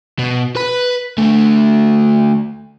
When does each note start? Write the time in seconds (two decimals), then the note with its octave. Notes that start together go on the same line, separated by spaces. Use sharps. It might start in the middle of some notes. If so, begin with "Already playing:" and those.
0.19 B2
0.56 B4 B5
1.18 D3 A3